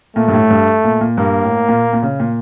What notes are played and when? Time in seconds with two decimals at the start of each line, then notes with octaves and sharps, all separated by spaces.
0.16 A#2 A3
0.28 G2
0.33 A2
0.50 G2
0.84 A#2
1.01 A#2
1.18 G2 A#3
1.43 A2
1.69 A#2
1.93 A#2
2.03 C#3
2.20 A#2